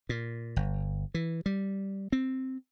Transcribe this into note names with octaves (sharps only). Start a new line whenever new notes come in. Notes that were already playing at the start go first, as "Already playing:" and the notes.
A#2
G1
E3
G3
C4